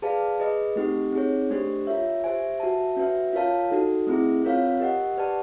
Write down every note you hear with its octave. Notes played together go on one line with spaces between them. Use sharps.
G#4 B4 D5 F5 A5
G#4 B4 D#5
A3 C4 D#4 G4
C4 D#4 G#4 C#5
A3 D4 G4 C5
F4 A#4 C#5 E5
G4 C5 E5 G#5
F#4 B4 E5 A5
C#4 F#4 B4 E5
F4 A#4 C#5 F5 A5
D#4 F#4 A4
A3 C4 E4 G#4
C4 F4 A#4 C#5 F5
G4 A#4 D#5 F#5
G4 B4 D5 F#5 A5